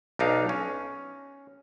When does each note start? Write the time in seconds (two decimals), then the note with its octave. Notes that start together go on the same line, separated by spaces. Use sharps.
0.19 B1 D4 D#4 F5
0.49 C#4